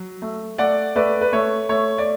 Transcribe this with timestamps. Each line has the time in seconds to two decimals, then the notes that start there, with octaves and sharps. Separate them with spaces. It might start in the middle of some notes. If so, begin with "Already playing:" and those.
Already playing: F#3
0.22 A3
0.58 A3 D5 F#5
0.96 A3 B4 D5
1.21 B4
1.33 A3 C#5
1.69 A3 C#5
1.98 D5